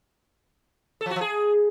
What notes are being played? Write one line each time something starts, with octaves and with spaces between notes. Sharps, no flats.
A4
F3
F#4
F3
G#4